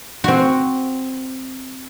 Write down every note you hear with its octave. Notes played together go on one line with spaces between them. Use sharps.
C4 F#4